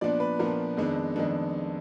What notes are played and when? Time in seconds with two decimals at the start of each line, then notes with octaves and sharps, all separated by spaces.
0.01 A#2 F3 B3 D4 D5
0.20 B4
0.39 A#2 F3 B3 D4 A#4
0.77 F2 D#3 G#3 B3 D4
1.16 F2 D#3 G#3 B3 D4